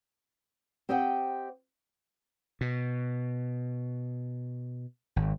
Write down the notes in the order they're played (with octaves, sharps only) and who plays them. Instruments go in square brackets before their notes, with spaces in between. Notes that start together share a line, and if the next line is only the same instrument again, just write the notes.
[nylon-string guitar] C4 G4 C5 D#5 F#5 G5
[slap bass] B2
G#1